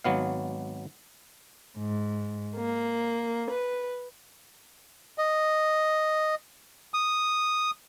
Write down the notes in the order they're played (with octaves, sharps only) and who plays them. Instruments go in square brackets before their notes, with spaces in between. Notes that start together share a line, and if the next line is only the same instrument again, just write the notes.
[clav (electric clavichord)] G#1 F#3 B3 F5
[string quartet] G#2
A#3
B4
[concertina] D#5
D#6